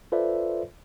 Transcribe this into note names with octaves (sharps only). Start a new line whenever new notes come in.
F4 A4 B4 C5 D5 E5